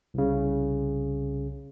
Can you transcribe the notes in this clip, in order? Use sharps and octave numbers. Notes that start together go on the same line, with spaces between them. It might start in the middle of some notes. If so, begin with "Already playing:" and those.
C2 C#3